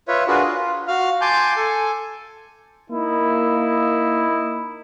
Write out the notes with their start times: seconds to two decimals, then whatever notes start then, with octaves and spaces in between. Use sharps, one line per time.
0.08 F4 B4 C#5 E5
0.28 D4 F4 F#4 G#4 A#4 B4
0.46 F4
0.88 F#4 F5 F6
1.21 G#5 A5 C6 D6 G6
1.57 A4 G#5
2.91 A#3 D#4 E4